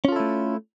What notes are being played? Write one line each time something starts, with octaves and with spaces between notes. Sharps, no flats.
A3 C#4 E4 F4 A4